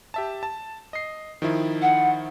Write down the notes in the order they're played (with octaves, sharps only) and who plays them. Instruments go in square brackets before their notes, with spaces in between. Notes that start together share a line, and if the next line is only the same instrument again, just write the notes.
[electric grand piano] G4 E5 A5
A5
D#5 C7
D#3 F3 E4
[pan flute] F#5